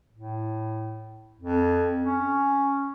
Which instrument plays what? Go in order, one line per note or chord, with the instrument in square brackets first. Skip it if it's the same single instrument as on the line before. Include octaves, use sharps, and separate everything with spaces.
[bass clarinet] A2
F2
C#4